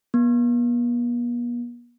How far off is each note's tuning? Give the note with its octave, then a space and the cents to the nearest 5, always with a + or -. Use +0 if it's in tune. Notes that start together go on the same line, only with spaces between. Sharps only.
B3 -45